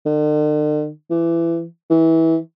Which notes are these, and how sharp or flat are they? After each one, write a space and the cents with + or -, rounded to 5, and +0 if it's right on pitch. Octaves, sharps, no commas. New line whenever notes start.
D3 +45
E3 +25
E3 -20